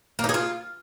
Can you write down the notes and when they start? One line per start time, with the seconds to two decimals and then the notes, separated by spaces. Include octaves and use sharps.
0.19 A#3
0.24 D#4
0.29 G#4
0.34 F4